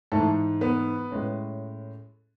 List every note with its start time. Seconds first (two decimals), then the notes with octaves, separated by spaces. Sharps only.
0.12 G#2 E3 G#3 A3 A4
0.61 B3 B4
1.11 A2 G#3 C#4